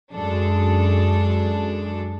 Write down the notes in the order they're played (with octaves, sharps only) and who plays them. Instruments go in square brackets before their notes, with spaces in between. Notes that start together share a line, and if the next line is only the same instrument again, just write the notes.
[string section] F#2 G#3 D4 A4